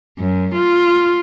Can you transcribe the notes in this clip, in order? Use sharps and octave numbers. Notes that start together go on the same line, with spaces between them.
F#2
F4